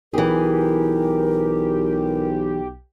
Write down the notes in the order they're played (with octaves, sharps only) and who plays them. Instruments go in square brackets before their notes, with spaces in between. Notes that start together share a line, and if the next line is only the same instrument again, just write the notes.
[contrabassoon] B1 [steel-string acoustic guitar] E3 G#4 [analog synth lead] G4 [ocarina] A#4